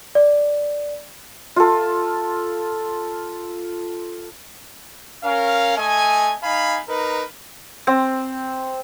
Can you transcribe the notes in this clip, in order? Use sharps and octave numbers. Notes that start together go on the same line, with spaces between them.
D5
F4 A4
C#4 A#4 F5
A3 D#5 G#5
D#4 F5 G#5 B5
D#4 A#4 B4
C4